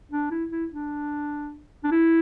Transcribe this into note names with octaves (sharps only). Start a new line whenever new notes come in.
D4
E4
E4
D4
D4
E4